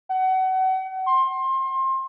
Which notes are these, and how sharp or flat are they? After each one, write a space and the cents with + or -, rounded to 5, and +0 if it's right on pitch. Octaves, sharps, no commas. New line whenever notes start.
F#5 +30
C6 +25